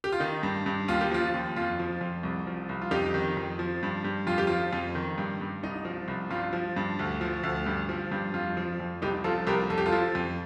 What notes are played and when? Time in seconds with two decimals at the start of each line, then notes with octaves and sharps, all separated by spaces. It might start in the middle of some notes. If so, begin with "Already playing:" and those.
0.04 G4
0.12 F4
0.20 D#3 D#4
0.43 G2
0.66 G2
0.88 D#2 F4
1.01 G4
1.11 F3 F4
1.34 D#2
1.56 F2 F4
1.79 F3
2.01 F2
2.23 C2
2.47 F3
2.69 C2
2.82 F4
2.91 F2 D#4 G4
3.14 D#3
3.37 F2
3.59 F3
3.83 G2
4.04 G2
4.27 F2 F4
4.38 G4
4.47 F3 F4
4.73 F2
4.95 D#3
5.18 G2
5.41 G2
5.63 C2 D#4
5.85 F3
6.08 C2
6.30 G2 F4
6.53 F3
6.76 G2
6.99 D2
7.21 F3
7.43 D2
7.66 G2
7.89 F3
8.12 G2
8.34 F2 F4
8.57 F3
8.80 F2
9.02 C2 D#4 G4
9.24 F3 F4 A4
9.47 C2 G4 A#4
9.70 F2 A4
9.78 G4
9.86 F4 A4
9.92 F3
10.15 F2